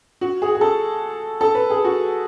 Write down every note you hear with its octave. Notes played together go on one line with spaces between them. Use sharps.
F#4
G#4
G#4
A4
A4
B4
G#4
F#4